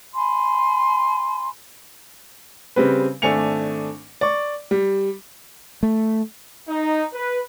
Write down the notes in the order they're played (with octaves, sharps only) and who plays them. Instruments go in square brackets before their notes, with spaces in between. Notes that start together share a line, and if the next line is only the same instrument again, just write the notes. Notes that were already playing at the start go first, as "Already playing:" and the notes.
[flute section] G#5 B5 C6
[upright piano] C#3 G3 C4 B4
G#1 A3 D4 G#5 C#7 F7
D5 C#6
G3
[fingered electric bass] A3
[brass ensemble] D#4
B4